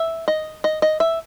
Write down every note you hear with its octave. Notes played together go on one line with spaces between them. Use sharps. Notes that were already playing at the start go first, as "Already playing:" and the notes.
Already playing: E5
D#5
D#5
D#5
E5